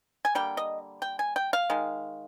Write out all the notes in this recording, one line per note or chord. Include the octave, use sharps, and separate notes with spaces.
G#5
D3 G3 A#3 G5
D#5
G5
G#5
G5
F5
D#3 G#3